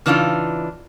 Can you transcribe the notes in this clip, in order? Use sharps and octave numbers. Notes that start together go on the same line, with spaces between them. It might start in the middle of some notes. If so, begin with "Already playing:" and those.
C#3 E3 D4 D#4 F4